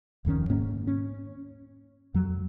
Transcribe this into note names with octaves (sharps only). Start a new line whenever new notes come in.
D1 F2 D#3 C#4
G#2 A#3 C#4
C#4
F2 F#3